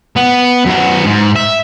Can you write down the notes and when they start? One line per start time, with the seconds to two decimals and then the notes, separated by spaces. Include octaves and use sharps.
0.16 B3
0.65 F#2 B3
1.05 G#2
1.36 E5